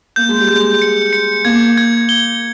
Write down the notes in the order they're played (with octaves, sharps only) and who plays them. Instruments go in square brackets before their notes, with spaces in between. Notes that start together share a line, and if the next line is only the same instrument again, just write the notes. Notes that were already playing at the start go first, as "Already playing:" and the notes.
[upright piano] A#3 [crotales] G6
[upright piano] G#3
G3
[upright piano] G#3 [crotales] G6
[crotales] C#7
C#7
[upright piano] A#3 [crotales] G#6
[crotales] G#6
G7